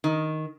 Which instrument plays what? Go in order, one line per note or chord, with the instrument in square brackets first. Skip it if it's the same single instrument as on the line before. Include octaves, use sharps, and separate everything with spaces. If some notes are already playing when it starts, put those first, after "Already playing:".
[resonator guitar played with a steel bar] D#3